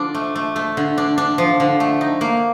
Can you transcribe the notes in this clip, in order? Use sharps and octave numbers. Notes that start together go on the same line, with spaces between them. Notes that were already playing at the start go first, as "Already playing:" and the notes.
Already playing: D3 F3 D4
A3
A3
A3
D3
D4
D4
F3
D3
A3
D#4
A#3